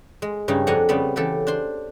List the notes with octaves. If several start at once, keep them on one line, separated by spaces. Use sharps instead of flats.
G#3
G2 C#3 G3 C#4 D#4 E4
F2 C4 D4 F#5 G#5 A#5
C#3 G3 B3 C4 A5 B5
C#3 E3 G4 A4
D4 C5 C6